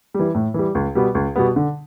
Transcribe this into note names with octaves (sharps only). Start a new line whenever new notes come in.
E3 G3
A2
E3 G3
C#2
B2 G3 B3
C#2
B2 G3 B3
D3